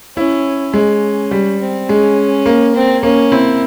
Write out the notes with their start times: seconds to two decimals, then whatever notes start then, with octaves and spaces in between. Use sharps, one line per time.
0.17 C#4 E4
0.74 G#3 C#4
1.31 G3
1.60 C4
1.89 G#3 C#4
2.46 A#3
2.75 C4
3.03 A#3 C#4
3.32 C4 E4